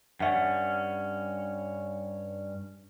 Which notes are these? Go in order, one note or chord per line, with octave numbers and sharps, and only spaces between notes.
G2 C#4 E5 F#5